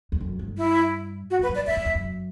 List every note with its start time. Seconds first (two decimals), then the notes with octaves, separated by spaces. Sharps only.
0.12 E2
0.20 F#2
0.39 G2
0.58 E4
1.31 F#4
1.39 F#2 B4
1.49 G2
1.55 D5
1.67 G2 E5
1.77 F#2
1.85 E2
1.95 F#2